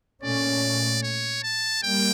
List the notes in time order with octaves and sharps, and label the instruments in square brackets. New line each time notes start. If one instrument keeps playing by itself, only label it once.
[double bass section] A#2 A3 C#4 [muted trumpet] D5
[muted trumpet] C#5
A5
[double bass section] G3 A#3 [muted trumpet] G5